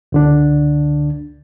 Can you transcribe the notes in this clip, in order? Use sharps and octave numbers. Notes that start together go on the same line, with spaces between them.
C#2 D3 D4